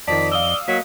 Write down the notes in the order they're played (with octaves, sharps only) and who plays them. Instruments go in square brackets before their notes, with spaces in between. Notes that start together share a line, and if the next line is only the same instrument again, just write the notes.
[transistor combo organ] F2 D#5 [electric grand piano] D#3 F3 A5 [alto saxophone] D5 [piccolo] B6
[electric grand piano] F5 D#6 E6 [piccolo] G7
[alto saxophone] F#3 [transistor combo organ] A#3 D#5 [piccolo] B6